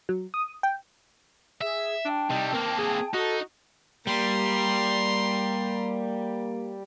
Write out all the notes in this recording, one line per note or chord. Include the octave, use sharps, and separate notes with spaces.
F#3
D#6
G5
G#4 E5
D4 G5 A5
C3 G3 D#4
A#3 C4 A#4
G#4
D#4 F#4 A4
G3 A#3 A#5 C6